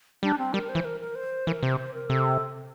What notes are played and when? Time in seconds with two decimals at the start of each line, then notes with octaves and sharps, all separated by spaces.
0.23 G3 D4
0.38 C4
0.54 G3 A#4
0.69 C5
0.75 E3
0.85 A#4
1.00 A#4
1.15 C5
1.47 E3 A#4
1.63 C3 C5
1.78 C5
1.94 A#4
2.09 C3 A4